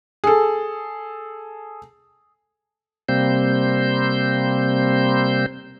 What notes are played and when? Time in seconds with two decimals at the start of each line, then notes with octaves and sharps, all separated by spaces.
0.24 G#4 A4
3.09 C3 G3 A#3 C4 C5 G6